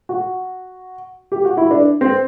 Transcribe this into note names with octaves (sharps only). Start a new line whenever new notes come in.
F#4
G4
F#4
E4
D4
C4